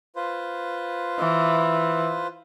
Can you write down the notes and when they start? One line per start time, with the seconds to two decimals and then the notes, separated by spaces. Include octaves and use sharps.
0.16 F4 B4 C5
1.19 E3